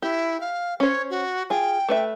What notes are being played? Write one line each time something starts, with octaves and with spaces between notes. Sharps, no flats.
E4 G4
F5
C#4 C5 C#5
F#4
F4 G#4 G5
A3 B4 E5